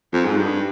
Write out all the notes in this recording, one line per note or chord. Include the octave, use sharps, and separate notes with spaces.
F2
G#2
G2